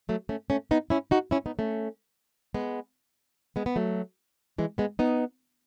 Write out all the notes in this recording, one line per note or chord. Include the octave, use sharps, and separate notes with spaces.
F#3 A3
A3 C#4
A3 C#4
B3 D#4
C#4 E4
D#4 F#4
C#4 E4
B3 D#4
A3 C#4
G#3 B3
G#3 B3
B3
F#3 A3
E3 G#3
G#3 B3
B3 D#4